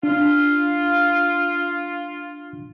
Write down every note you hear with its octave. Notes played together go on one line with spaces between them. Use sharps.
D4 F4